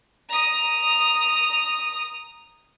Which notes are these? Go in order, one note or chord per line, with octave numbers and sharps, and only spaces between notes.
A#5 D#6